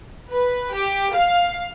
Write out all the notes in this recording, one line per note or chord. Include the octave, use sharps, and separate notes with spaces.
B4
G4
F5